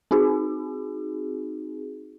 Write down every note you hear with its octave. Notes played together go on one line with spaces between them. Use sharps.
C4 D#4 F#4 G#4